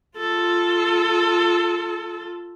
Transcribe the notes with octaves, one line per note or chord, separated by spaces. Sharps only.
F4 A4